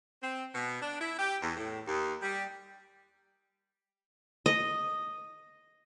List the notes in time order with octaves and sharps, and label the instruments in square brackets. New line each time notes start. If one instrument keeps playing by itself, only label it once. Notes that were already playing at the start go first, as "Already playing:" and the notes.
[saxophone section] C4
B2
D4
E4
G4
E2
A2
D#2
G3
[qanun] D#5